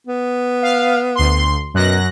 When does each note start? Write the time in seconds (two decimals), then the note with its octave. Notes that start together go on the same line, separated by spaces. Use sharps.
0.07 B3
0.62 F5
1.15 D2 C6
1.74 F#2 B2 F#6 A#6